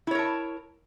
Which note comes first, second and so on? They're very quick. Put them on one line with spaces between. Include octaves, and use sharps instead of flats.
E4 C#5 A#4 A5